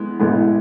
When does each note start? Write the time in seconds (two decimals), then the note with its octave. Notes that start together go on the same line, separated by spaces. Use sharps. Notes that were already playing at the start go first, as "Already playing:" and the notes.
Already playing: A2 G#3 B3
0.19 A1 A2 G#3 B3